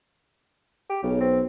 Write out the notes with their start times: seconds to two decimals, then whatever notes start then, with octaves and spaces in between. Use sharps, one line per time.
0.90 G4
1.03 B1 C#3
1.20 C4